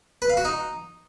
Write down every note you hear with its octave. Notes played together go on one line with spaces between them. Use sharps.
B4
F5
F#4
D#4